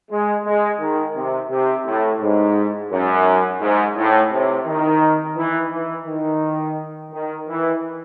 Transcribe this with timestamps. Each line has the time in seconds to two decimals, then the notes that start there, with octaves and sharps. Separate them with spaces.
0.10 G#3
0.46 G#3
0.80 D#3
1.15 C3
1.50 C3
1.86 A2
2.21 G#2
2.91 F#2
3.61 G#2
3.97 A2
4.31 C3
4.67 D#3
5.37 E3
5.72 E3
6.07 D#3
7.12 D#3
7.48 E3